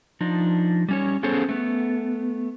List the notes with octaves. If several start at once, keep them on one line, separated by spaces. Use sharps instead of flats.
F3 D4 D#4
G3 C#4 C#5
B3 C#4 G#4 A4 C5 C#5
A3 B3